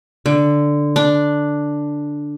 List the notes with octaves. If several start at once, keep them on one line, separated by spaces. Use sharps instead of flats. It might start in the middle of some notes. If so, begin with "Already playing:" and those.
D3
D4